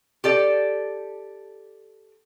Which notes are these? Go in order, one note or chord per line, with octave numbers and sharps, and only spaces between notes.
G4 A4 D5